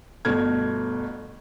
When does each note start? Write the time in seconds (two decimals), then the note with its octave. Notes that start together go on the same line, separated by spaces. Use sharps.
0.25 G1 B2 A3 F6 G#6